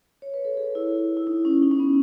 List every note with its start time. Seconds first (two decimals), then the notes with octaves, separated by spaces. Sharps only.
0.22 C#5
0.34 B4
0.45 A4
0.57 G#4
0.75 E4
1.17 E4
1.27 D#4
1.45 C#4
1.62 D#4
1.71 C#4
1.80 B3